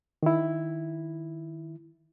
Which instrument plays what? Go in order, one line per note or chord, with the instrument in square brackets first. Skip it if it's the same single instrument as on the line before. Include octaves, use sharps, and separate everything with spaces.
[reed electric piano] D#3 E4